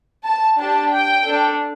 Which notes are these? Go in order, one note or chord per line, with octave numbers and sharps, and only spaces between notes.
A5
D4 G4 A5
G5
D4 A4